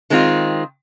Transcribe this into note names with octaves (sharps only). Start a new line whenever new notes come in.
D#3 G#3 C4 F4